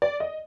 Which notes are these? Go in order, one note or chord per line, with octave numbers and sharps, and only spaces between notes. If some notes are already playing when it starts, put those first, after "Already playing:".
D5
D#5